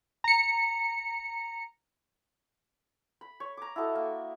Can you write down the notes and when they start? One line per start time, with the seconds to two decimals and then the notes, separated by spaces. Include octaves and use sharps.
0.24 A#5 C#7
3.21 B5
3.40 C#5
3.57 A#5 D6
3.76 E4 F#4 A4 D#5
3.95 A#3